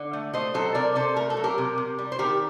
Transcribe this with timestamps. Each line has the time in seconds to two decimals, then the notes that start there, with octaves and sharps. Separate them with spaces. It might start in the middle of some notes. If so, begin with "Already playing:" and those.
Already playing: D3
0.13 A3
0.34 A3 C5 D#5
0.54 F#3 A4 C5
0.74 C3 A#4 D5
0.95 C3 A4 C5
1.16 A3 A#4
1.30 A4
1.37 F#3
1.44 G4 A#4
1.58 C3
1.78 C3
1.99 G3
2.12 C5
2.19 D#3 G4 A#4